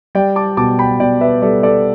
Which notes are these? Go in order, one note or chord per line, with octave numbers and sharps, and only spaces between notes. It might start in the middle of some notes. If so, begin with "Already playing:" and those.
G3 D5 G5
A5 D6
B2 A5 D6
G5 B5
B2 D5 G5
B4 E5
G3 A4 D5
A4 D5